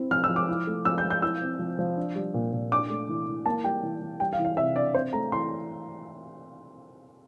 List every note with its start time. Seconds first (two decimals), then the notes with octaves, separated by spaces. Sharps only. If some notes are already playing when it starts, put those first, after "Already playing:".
Already playing: C4 E4
0.11 F3 F6
0.24 E6
0.29 F3
0.36 D6
0.48 E4
0.67 A3
0.85 F3 E6
0.98 G6
1.04 F3
1.10 G6
1.22 E4 E6
1.42 C4
1.59 F3
1.79 F3
1.97 D4
2.16 G3
2.34 A#2
2.53 A#2
2.72 D4 D6
2.90 A3
3.09 E3
3.27 E3
3.46 A#3 A5
3.64 G3 G5
3.83 E3
4.02 E3
4.20 G3 G5
4.33 F5
4.39 E3
4.45 F5
4.57 C3 E5
4.76 D4 D5
4.94 C4 C5
5.13 A3 A#5
5.32 E3 C6